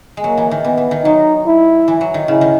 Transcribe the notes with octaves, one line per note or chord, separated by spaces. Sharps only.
G#3
F#3 A#3
E3
D#3
E3 B3
E3
D#3
F#3 D#4
E4
E3
F#3
D#3
C#3 E4
D#3